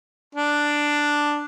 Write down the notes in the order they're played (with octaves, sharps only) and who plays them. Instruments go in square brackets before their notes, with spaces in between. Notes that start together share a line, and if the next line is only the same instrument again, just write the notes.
[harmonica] D4